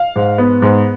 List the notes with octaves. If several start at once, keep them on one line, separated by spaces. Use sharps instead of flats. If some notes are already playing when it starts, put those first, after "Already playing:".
Already playing: F5
G#2
B3
G#2